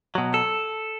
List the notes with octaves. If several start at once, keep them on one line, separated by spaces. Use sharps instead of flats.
B2 F#3
A4